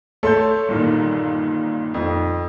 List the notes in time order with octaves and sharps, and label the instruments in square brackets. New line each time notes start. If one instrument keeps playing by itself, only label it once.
[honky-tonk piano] A3 C#5 [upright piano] A4 C6 G6
[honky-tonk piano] G1 A#2 D#3
[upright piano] F2